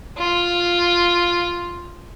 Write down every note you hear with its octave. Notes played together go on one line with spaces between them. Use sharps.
F4